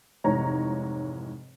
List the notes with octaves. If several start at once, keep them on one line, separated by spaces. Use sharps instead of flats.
F1 G#2 E3 C#5 A#5